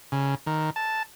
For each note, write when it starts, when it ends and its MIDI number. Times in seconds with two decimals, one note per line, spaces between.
0.12 0.35 49
0.47 0.70 51
0.76 1.03 81